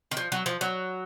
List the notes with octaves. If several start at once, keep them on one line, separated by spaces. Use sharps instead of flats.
D#3
F3
F#3
F3
F#3